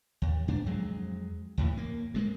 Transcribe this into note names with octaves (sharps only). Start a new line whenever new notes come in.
D#2
G2 D4
F2 F#3 G#3
D#2 A2 E3
A#3
G2 G#3 A#3